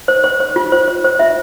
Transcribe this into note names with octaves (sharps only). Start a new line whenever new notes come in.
C5
C5
C5
F4
C5
C5
C5
F4 E5